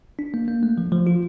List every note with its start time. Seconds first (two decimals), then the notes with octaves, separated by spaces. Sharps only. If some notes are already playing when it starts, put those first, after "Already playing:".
0.19 D4
0.34 A#3
0.48 A#3
0.63 A3
0.78 F3
0.92 F3
1.07 F4